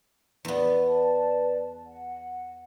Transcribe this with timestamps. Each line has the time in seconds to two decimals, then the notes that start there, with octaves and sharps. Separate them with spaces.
0.45 E2 B3 D5
0.87 B4 D5 A5
1.86 F#5